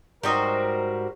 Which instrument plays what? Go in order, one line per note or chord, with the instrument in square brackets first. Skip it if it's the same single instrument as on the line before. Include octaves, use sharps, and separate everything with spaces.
[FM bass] G#2 [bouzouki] G3 F#4 C5 [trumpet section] A#4 [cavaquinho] D#5 G5 A#5